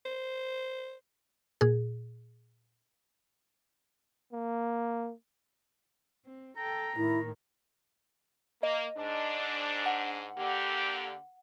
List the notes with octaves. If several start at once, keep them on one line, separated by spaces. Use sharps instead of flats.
C5
A#2 G#4
A#3
C4
A4 G5 A#5
A2 D#3 E4
A#3 D#5
G#2 D4
F#5
D3 A#3 G4